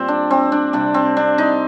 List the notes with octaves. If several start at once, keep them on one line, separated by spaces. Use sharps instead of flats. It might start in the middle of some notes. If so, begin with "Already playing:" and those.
Already playing: A#2 G3 C4
D4
C4
D4
C3 G3 D4
C4
D4
D#4